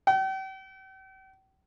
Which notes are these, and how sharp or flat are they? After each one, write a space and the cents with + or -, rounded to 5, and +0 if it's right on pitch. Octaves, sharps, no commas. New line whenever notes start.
G5 -40